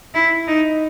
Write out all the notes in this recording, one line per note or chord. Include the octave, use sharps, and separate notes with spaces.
E4
D#4